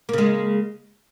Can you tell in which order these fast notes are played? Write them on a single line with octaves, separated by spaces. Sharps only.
A#3 C#3 G#3